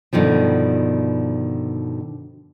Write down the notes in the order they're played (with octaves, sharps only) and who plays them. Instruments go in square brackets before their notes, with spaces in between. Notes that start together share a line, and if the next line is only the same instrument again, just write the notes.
[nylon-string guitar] G2 B2 D3 D#3 F3